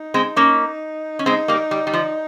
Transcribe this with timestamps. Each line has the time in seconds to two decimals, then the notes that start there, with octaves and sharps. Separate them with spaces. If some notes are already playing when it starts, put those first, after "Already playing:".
Already playing: D#4
0.14 G#3 C4
0.36 A#3 C#4
1.19 C#4
1.26 G#3 C4 D#4
1.48 G3 A#3
1.71 G3
1.87 G3
1.94 F3